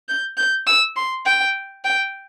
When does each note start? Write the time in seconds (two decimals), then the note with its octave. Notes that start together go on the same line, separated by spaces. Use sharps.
0.08 G6
0.37 G6
0.67 E6
0.96 C6
1.25 G5
1.84 G5